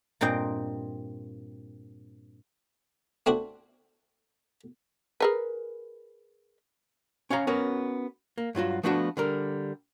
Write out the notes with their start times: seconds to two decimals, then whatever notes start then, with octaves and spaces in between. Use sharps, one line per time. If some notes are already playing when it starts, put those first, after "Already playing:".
0.21 G2 A#2 C4 D#5 G5
3.26 A3 C4 D4 F#4
5.20 G#4 A#4 B4
7.30 C#4 C#5 F5 G#5 A#5
7.47 B3 C#4 F#4 A#4
8.38 A#3
8.55 G2 F#3 F4 F#4
8.83 F3 A3 B3 D4 D#4 F#4
9.17 D3 G3 A#4